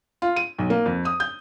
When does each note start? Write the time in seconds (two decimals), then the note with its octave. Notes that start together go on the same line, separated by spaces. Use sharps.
0.22 F4
0.36 D#7
0.58 B1
0.70 A#3
0.86 F2
1.05 D#6
1.20 G6